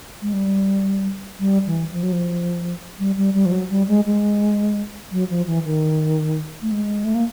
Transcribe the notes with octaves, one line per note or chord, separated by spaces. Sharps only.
G#3
G3
G3
E3
F3
F#3
F3
G3
G3
G3
F3
F#3
G3
G#3
G#3
F#3
F3
E3
D#3
A3
G#3
A3
A#3